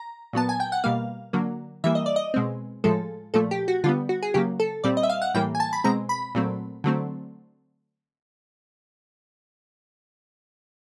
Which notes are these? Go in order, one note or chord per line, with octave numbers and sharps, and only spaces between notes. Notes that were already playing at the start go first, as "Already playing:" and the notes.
Already playing: A#5
A#2 F#3 B3 A5
G#5
G5
F#5
B2 G3 A#3 F5
D3 F#3 A#3
E3 G3 A#3 E5
D#5
D5
D#5
B2 G#3 C4
A2 F3 G#3 A4
A#2 F3 A3 A4
G4
F#4
D3 G3 B3 F4
F#4
G#4
C#3 F#3 A#3 G4
A4
A#2 G3 C4 D5
D#5
E5
F5
F#5
A2 E3 G3 A#3 G5
G#5
A5
B5
B2 G#3 C4 A#5
B5
A#2 F#3 A3 C4
D3 F#3 A3 C4